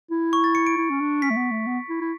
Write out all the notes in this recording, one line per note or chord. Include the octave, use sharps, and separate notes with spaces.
E4
C#6
A6
C#7
D7
E4
C#4
D4
C#4 B6
A3
B3
A3
B3
E4
E4